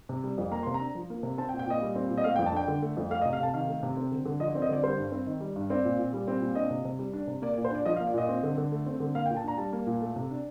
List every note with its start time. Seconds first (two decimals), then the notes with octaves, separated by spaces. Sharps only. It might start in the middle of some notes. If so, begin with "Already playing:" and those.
0.09 C3
0.24 G3
0.38 F2
0.51 A#3 A#5
0.63 C3 C6
0.74 A#5
0.80 D4
0.95 F3
1.10 A#3
1.23 C3
1.38 C4 A5
1.49 G5
1.53 A#2
1.59 G5
1.66 A#2 D#5
1.82 G3
1.96 C4
2.10 A#2
2.17 D#5
2.24 A3 F5
2.36 G5
2.39 F2
2.46 A5
2.53 D4 G5
2.68 D3
2.82 A3
2.97 F2
3.11 A3 F5
3.21 D#5
3.25 C3
3.33 F5
3.40 C3 A5
3.54 D#3 F5
3.68 A3
3.83 C3
3.97 C4
4.11 D3
4.25 D3
4.40 F3 D#5
4.51 D5
4.55 C4
4.62 D#5
4.69 D3 D5
4.83 G3 C5
4.98 G2
5.12 C4
5.26 D#3
5.41 G3
5.56 G2
5.70 C4 D5
5.85 A#2
5.99 A#2
6.13 G3
6.28 C4
6.41 A#2
6.55 D4 D#5
6.71 C3
6.85 C3
6.99 G3
7.13 D4
7.27 C3
7.42 A#3 D5
7.54 D5
7.57 A#2
7.64 C5
7.71 D4 D5
7.86 F3 D#5
7.96 F5
8.00 A#3
8.07 D5
8.14 A#2 D#5
8.29 C4
8.43 D3
8.58 D3
8.72 A3
8.86 C4
9.00 D3
9.15 A#3 F5
9.26 G5
9.30 A#2
9.37 A5
9.44 D4 A#5
9.58 G3 A5
9.73 A#3
9.86 A#2
10.01 A3
10.16 C3
10.30 D4